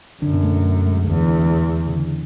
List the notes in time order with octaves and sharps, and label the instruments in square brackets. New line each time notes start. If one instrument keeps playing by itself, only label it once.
[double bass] F#2 [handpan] D3 D4
[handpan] B2 B3
A3
A3
G#3
[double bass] E2 [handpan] D3
[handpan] E3
E3
C#3
D3